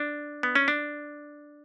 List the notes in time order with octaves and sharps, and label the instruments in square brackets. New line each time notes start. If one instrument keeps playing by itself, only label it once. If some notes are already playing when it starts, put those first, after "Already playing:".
Already playing: [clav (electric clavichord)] D4
B3
C#4
D4